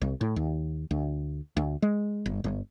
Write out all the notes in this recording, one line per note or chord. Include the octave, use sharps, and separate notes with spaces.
C2
A2
D#2
D2
D2
G#3
G1
G1